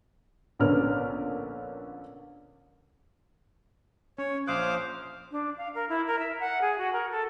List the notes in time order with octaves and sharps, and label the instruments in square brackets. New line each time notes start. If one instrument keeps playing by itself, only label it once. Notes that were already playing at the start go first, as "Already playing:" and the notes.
[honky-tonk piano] A#1 D3 B3 C#4 A#4 F6
[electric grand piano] C#4 [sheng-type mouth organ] C#5
[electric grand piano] A#1 D#6 F#6 [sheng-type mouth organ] C5 F5 D6
[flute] D4
F5
A#4
E4
A#4
E5
F#5
G#4
F#4
A#4
A4